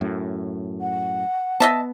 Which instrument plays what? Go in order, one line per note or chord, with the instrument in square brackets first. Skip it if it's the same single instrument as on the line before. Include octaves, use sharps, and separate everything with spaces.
[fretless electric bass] F#2 A2
[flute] F#5
[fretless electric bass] B3 [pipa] D#5 E5 A5